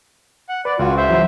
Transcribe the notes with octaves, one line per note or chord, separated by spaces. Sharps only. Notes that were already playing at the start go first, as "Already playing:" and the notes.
F#5
B4 D5
C#2 F4 F#4
C5 E5
E3 F#3